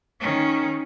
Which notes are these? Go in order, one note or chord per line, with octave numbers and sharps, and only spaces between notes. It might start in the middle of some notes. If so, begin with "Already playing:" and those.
D#3 C#4